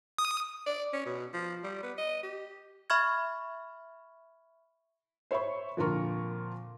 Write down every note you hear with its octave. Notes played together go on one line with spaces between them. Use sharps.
D#6
D5
C#4
B2
F3
G3
B3
D#5
G4
E5 B5 C#6 F6 G#6
C5 C#5 E5 B5 C#6
F2 A#2 D3 F4 A#4 C#6